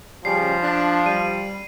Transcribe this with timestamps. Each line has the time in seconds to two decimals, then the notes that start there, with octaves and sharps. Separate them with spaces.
0.25 C#3 F3 G3 C7
0.63 D4
1.06 G3 D#7